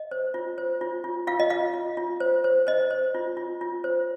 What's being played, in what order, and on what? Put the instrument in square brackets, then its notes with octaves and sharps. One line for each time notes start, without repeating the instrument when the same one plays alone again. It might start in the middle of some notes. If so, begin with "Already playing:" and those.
Already playing: [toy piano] D#5
C5
F4
C5
F4
F4
F4 F5
D#5
F4 F5
F4
F4
C5
C5
C5 D#5
C5
F4
F4
F4
C5